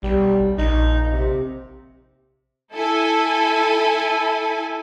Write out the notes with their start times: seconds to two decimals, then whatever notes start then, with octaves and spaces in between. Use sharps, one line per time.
0.03 B1 G3
0.58 A#1 D#4
1.12 C3
2.74 E4 A4 G#5